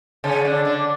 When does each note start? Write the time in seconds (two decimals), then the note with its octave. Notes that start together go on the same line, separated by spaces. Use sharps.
0.24 C#3 C#4
0.45 D3 D4
0.64 D3 D4